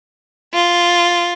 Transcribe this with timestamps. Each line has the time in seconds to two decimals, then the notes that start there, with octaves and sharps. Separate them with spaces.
0.54 F4